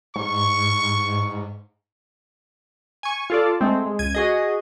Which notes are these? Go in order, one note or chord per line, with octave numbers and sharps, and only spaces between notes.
G#2 C#6
G#5 C#6
F4 A4 D5
G#3 A3 C4
G#3
C#2 G#6 D#7
F#4 G#4 D#5